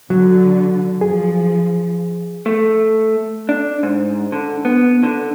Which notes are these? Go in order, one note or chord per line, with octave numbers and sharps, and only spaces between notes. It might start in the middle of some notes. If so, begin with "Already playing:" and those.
D3 F#3
F3 G#4
A3
D4
G#2
D3
B3
D3